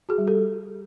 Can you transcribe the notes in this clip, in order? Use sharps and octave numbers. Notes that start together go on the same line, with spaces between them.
F#4 G#4
G3
G4 A4